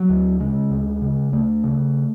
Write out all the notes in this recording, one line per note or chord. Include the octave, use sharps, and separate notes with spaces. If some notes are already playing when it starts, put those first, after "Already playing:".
Already playing: F#3
D2
C#3 G#3
D2
C#3
D2 A3
C#3